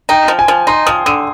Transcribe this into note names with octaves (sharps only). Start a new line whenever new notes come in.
D#4 G5
F3
G#5
F3
D#4 C6
F3 D#6
D3 D#6